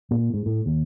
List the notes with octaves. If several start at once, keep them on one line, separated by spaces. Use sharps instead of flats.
A#2
G#2
A2
D#2